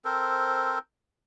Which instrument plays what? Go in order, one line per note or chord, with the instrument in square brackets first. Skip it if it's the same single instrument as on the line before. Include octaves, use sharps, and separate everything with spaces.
[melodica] C4 A4 A#4 C5